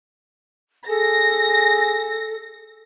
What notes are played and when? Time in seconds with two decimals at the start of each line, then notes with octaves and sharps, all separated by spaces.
0.89 G#4 A4 A#6